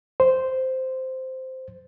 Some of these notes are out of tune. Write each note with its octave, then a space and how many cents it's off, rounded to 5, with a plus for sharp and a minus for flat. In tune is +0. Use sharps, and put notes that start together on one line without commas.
C5 -5